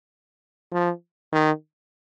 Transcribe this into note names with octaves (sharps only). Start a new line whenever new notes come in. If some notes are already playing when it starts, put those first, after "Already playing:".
F3
D#3